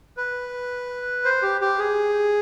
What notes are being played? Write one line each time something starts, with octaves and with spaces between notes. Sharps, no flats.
B4
C5
G4
G4
G#4